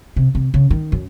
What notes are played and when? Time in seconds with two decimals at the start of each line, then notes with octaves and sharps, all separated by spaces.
0.16 C3
0.35 C3
0.54 C#3
0.71 D#3
0.92 F#2